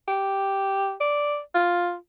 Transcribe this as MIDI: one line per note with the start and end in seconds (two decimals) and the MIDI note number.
0.08 0.93 67
1.00 1.39 74
1.55 1.95 65